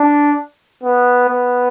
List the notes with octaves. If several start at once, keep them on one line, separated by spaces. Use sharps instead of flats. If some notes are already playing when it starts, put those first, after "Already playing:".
Already playing: D4
B3
B3